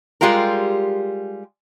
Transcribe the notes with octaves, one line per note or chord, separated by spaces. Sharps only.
G3 G#3 F4 G4 A#4